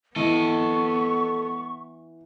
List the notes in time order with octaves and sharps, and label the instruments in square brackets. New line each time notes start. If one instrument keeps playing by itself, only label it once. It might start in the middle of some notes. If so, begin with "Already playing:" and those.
[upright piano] E3 [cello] B3 [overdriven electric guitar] A4 D#5 [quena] C#6